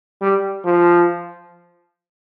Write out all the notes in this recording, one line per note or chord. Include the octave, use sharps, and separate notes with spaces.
G3
F3